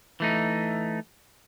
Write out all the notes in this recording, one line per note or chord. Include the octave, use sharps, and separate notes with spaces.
E3 A3 D#4